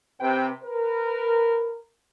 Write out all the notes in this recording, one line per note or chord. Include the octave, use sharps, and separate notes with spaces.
C3 B4 G5
A#4 B4